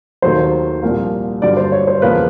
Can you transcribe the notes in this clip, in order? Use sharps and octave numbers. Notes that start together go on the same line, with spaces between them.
D#2 D#3 F#3 A3 C5
C2 A#2 F3 A#3
G2 D3 F#3 D5
C5
C#5
C5
E2 C#3 F3 A#3 B4